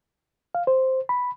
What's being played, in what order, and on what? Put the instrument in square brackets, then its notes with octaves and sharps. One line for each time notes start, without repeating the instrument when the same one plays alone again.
[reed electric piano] F5
C5
B5